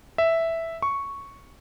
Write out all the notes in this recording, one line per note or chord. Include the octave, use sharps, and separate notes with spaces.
E5
C#6